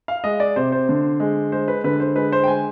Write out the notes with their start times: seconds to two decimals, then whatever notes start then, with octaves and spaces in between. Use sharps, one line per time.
0.08 F5
0.24 G#3 D#5
0.40 D5
0.56 C3 C5
0.72 C5
0.89 D3
1.20 G#3
1.52 G#3 C5
1.68 B4
1.84 D3 B4
2.00 C5
2.16 G#3 B4
2.32 C5
2.44 G5
2.47 G#3 G#5